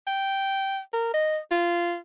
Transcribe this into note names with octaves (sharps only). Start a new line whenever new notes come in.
G5
A#4
D#5
F4